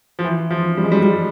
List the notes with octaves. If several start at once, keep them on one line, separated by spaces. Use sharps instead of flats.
F3
E3
F3
G3
G#3
G3
G3